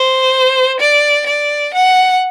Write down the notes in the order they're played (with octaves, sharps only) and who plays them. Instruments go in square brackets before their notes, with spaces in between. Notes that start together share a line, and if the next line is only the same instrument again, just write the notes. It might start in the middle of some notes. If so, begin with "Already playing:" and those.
Already playing: [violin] C5
D5
D5
F#5